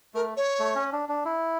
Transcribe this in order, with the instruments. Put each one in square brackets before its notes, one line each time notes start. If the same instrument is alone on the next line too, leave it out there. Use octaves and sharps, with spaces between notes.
[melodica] A3 [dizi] A#4
[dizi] C#5
[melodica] A3
C#4
D4
D4
E4